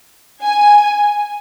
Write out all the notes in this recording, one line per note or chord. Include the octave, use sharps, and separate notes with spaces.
G#5